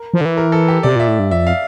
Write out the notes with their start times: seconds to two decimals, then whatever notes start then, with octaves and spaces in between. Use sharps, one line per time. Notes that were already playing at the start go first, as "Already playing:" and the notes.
Already playing: A#4
0.14 F3
0.21 D3
0.25 E3
0.37 A#4
0.52 A4
0.68 G4
0.83 C3 D5
0.96 A#2 E5
1.08 A2
1.19 G2
1.31 F2 E5
1.47 F5